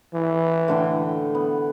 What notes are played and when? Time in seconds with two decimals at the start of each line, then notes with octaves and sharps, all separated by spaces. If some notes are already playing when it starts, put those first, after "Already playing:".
0.14 E3
0.68 A2 D3 G5
1.35 B3